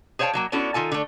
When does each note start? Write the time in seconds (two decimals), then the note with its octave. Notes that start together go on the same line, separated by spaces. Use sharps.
0.19 G#4 C5 C#5 F5 G5 A5
0.33 B2 F#3 A#3
0.52 B3 C#4 D4 E4 F#4 A4
0.74 D#3 F4 A4 G#5
0.92 D3 A3